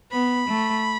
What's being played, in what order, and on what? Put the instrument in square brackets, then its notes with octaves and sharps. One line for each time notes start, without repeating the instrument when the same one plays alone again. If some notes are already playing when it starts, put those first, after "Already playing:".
[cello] B3 [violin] B5
[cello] A3